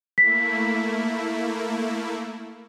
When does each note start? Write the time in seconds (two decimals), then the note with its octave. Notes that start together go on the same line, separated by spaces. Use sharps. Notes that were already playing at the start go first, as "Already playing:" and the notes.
0.18 A3 A#3 E4 B6